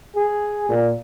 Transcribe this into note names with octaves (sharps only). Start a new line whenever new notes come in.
G#4
A#2